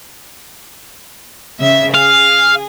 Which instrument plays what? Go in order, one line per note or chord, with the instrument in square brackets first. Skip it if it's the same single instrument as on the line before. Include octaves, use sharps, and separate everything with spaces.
[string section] C#3 E5
[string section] G#4 [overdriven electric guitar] F5